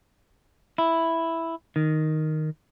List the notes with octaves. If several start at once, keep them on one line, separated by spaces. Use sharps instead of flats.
E4
D#3